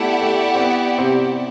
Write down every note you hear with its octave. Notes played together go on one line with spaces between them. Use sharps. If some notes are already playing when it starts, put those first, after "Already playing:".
Already playing: A3 B3 E4 G4 D5 F#5
A3
C4
B3
C3 C4